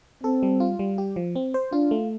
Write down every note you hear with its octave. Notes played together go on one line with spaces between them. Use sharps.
C4 A4
G3
F4
G3
G4
F3
C4
C5
D4 F4
A3